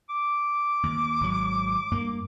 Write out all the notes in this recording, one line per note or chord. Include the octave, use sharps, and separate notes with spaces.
D6
D#2
G#1 F#3
G2 A#3